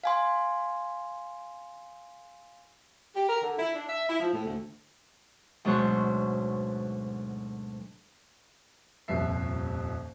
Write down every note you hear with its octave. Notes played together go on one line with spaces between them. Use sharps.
F5 G#5 C6
G4
A#4
D3
E4
D4
E5
E4
F3
A2
D2
D2 G#2 B2 F#3 C5 C#6
D#1 C2 F2 F3 E5 C7